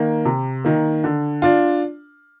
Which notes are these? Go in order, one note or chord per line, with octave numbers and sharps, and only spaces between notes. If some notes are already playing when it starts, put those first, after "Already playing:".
Already playing: D#3 A#3
C3
D#3 A#3
D3
D4 F4